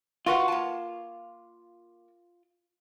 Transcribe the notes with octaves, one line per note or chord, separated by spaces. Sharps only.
F4 F#4 B4 F#5
A#3 A5